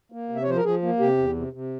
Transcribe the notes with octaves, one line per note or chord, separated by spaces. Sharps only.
A#3
C3
E5
C#5
F3 C5
A#4
F3 G#4
A#3
C3 G4
E2
C3
C3